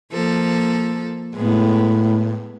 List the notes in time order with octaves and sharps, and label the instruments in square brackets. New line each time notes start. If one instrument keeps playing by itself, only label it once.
[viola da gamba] F3 A#3 A4
[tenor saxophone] A2 [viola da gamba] G#3 B3